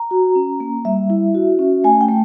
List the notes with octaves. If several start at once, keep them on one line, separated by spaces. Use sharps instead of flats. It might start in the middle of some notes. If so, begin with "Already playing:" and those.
Already playing: A#5
F#4
C#4
A#3
G3 E5
E4
F#4
C#4
A3 G#5
G5
A3